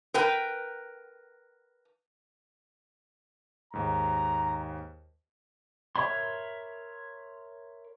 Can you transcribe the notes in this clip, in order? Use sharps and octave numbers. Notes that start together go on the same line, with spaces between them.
A#4 B4 G5
D#2 G#2 A#5
A#4 C#5 E5 B5 C6